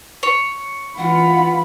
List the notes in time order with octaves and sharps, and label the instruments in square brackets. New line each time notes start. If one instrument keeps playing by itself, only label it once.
[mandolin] C#5
[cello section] E3 F4 [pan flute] F#5 [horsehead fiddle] B5